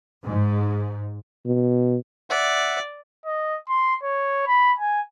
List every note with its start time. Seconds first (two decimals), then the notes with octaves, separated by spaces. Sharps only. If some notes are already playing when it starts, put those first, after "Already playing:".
0.23 G#2
1.46 B2
2.30 D5 E5 F#5
3.26 D#5
3.69 C6
4.03 C#5
4.47 B5
4.78 G#5